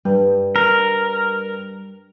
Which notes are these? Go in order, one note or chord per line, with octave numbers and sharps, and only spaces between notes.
G2 G3
A#4